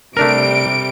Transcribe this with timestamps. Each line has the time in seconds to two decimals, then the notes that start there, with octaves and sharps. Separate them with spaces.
0.17 C3 G3 A3 D4 A#4 D7